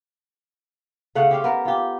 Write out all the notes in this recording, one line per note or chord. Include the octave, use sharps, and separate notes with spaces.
C#3 A3 C#5 F#5
G4 C5 F5
B3 A#4
F4 G4